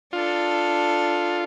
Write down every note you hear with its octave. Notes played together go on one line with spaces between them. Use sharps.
D4 F4 A4